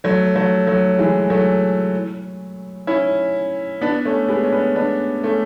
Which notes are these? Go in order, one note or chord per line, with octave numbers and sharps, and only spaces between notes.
F#3 A3
F#3 A3
F#3 A3
E3 G#3
F#3 A3
C#4 E4
B3 D4
A3 C#4
G#3 B3
C#4
B3 D4
B3 D4
A3 C#4